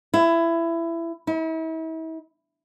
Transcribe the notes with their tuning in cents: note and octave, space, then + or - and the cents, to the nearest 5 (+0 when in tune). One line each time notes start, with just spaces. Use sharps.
E4 +20
E4 -40